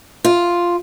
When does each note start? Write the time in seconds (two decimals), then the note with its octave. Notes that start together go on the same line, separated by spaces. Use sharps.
0.25 F4